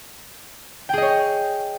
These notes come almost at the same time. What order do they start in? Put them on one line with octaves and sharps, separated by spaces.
G5 G#4 D#5 C#5